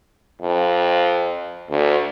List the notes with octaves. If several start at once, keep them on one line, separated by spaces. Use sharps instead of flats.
F2
D2